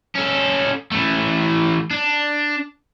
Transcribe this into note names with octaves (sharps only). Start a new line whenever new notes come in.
C#4 A4
E3 A3
D4